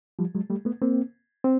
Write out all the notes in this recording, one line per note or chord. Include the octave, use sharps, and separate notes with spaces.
F3 G3
F#3 G#3
G3 A3
A3 B3
A#3 C4
C4